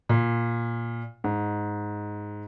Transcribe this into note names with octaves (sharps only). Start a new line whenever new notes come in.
A#2
G#2